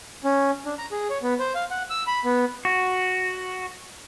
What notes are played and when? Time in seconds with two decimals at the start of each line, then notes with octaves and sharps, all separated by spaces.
0.24 C#4
0.65 D4
0.78 A#5
0.91 G#4
1.10 C#5
1.22 B3
1.39 C5
1.55 F5
1.71 F#5
1.90 E6
2.07 B5
2.25 B3
2.65 F#4